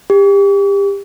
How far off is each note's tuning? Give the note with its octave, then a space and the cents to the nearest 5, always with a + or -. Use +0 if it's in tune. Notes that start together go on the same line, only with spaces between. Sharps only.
G4 +30